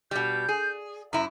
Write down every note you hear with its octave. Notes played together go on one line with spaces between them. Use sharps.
B2 G3 G6
G#4
F#2 E4 A#5